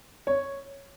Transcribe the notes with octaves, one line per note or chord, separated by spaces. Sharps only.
C#5